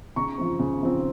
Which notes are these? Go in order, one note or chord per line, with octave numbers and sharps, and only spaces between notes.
C#3 A#5 C#6
F3 C4
C#3
F3 C4